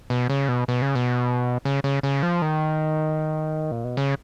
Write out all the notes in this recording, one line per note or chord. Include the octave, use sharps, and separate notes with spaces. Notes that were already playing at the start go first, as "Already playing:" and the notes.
B2
C#3
B2
B2
C#3
B2
C#3
C#3
C#3
F3
D#3
A#2
B2
C#3